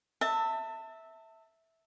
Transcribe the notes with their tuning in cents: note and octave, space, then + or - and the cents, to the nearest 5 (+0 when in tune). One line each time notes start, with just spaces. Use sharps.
E5 -10 A5 +30